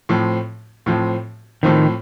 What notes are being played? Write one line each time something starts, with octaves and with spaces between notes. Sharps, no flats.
A2 F3 C4
A2 F3 C4
A2 D#3 F3 C4